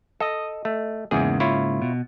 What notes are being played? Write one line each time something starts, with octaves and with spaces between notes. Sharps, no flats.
A4 D#5
A3
E2 G#2 C#3 A#3 G#4
E4 F4 C#5
B2